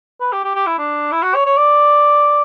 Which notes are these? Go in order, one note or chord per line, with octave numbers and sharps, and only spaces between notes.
B4
G4
G4
G4
E4
D4
E4
F#4
C#5
C#5
D5